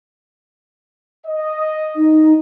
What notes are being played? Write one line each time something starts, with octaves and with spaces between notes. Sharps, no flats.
D#5
D#4